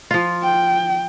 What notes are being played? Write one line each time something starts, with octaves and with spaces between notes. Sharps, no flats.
F3 F4
G5